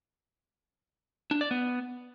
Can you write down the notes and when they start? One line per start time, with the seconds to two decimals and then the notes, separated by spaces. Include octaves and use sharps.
1.31 D4
1.41 D5
1.51 B3